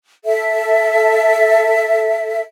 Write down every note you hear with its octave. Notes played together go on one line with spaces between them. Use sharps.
A4 E5